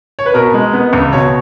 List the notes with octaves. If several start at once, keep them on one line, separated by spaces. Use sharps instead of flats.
C#5
B4
B2 A#4
G#3
B3
C#2
B2 C#5